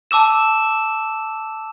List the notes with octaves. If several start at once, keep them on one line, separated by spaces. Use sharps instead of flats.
A5 D6 E6 E7